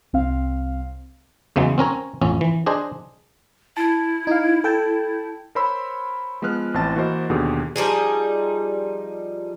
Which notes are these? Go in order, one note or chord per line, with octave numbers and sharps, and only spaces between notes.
C2 C4 F5
E2 C#3 E3 F#3 G#3
C4 C#4 A#4 C#5
A1 F2 C#4
E3
D4 G#4 C5 D#5
E4 A5
D#4 F5
A4 G5 A5
A#4 C5 C#5 B5 C6 E6
F3 G#3 B3 B4 F6 F#6
A1 E3 C4 C5 A5 A6
E3 A#3 F#4 A#4 C5 D#5
D#2 B2 D3 G4 G#4
F3 G3 D#4 G#4